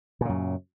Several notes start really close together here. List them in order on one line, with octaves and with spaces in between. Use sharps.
A#2 C#3 F#2